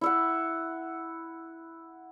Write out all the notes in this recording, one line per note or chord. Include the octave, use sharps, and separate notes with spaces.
E4 E5 F#5